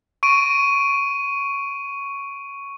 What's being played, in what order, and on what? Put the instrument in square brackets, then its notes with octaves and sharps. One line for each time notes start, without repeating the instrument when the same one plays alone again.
[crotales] C#6 D7 D#7